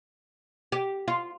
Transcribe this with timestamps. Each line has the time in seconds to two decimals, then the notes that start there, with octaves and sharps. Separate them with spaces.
0.72 G4
1.08 F4